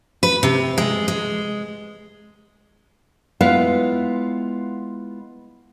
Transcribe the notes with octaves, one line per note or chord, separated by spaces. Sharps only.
B4
C3
G#3
G#3
G#3 B3 E4 F4 B4 F5